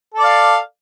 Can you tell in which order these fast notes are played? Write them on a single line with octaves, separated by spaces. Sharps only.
A4 D5 F5